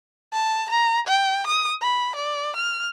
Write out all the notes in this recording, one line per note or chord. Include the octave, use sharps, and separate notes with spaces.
A5
A#5
G5
D#6
B5
D5
F6